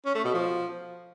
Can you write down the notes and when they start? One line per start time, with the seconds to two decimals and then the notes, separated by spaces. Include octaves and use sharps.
0.05 C#4
0.15 A3
0.24 B2
0.34 F3